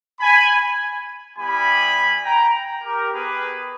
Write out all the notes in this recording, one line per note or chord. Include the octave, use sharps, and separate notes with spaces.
G#5 B5
G3 B3 E4 G4 G#5 B5
G5 A#5
G4 A#4
B3 G4 G#4 B4